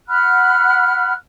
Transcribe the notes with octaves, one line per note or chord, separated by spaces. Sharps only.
F#5 B5 F6 F#6